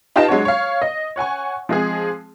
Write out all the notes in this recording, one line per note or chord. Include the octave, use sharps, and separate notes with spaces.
D#4 F4 G4 B4 D#5 A5
F#3 G#3 D4 F#4 C#5
C#5 F5
D#5
C#5 F#5 G#5 C#6
F3 G#3 C4 G#4